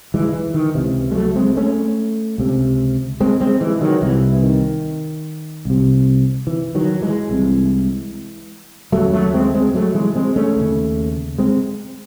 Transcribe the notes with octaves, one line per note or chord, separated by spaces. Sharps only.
E3 G#3
E3
D#3
C#2 C3 E3
G#3
F#3 A3
G#3 C4
A3 C#4
C#2 C3
G#3 C4
G#3 C4
E3 G#3
D#3 F#3
C2 C3 E3
D#3
C2 C3
E3
D#3 F#3
E3 G#3
C2 C3
D#2 C#3 F#3 A3
F#3 A3
G#3 C4
G#3 C4
F#3 A3
E3 G#3
G#3 C4
A3 C#4
D#2 C#3
G#3 C4